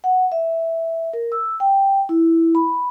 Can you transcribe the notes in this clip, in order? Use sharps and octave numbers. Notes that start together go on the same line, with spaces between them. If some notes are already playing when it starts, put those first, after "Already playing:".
F#5
E5
A#4
E6
G5
E4
B5